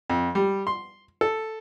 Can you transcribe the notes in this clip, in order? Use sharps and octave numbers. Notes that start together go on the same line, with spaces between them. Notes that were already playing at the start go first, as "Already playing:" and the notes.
F2
G3
C6
A4